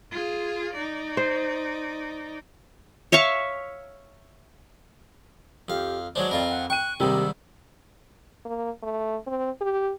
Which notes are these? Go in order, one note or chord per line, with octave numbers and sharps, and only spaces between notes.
F4 G#4
D#4 D5
C5
C#5 E5 F5 C#6
F2 G4 F5
F#3 G#3 D4 C5 C#5
F2 C4 F4 A#4 D5
F#5
G5 C#6 F#6 D#7
G#2 C3 D#3 G3 A#3 G4 E6
A#3
A3
C4
G4